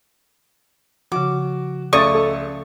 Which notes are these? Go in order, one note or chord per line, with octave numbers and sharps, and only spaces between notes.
C#3 F3 F#4 D6
C#2 A3 D5 C#6 D#6 A6
A4